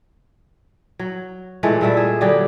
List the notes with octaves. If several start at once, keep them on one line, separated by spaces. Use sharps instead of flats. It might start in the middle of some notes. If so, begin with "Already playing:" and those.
F#3
A#2 E3 G#3 A3
A#2 G3 A3 E5
G#4
D3 F#3 G3 G4